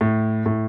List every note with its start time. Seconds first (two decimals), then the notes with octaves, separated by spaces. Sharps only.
0.01 A2
0.46 A2